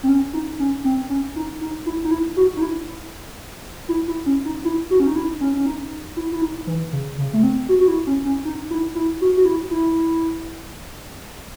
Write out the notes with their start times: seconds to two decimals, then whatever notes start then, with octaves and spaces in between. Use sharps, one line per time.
0.03 C4
0.09 C#4
0.33 D#4
0.59 C#4
0.84 C4
1.10 C#4
1.36 D#4
1.61 D#4
1.86 E4
2.04 D#4
2.11 E4
2.37 F#4
2.57 D#4
2.62 E4
3.89 E4
4.08 E4
4.26 C#4
4.45 D#4
4.65 E4
4.91 F#4
5.00 C#4
5.07 D#4
5.16 E4
5.41 C#4
5.54 C#4
5.66 D#4
6.17 E4
6.32 E4
6.42 D#4
6.67 E3
6.93 C#3
7.18 C#3
7.33 A3
7.43 C4
7.69 F#4
7.81 F#4
7.88 E4
8.07 C#4
8.25 C#4
8.45 D#4
8.70 E4
8.95 E4
9.21 F#4
9.37 F#4
9.45 E4
9.71 E4